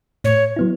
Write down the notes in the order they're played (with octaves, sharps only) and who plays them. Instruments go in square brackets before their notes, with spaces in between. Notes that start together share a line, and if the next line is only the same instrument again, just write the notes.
[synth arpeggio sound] A2 [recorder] C#5
[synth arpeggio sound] F#3 B3 E4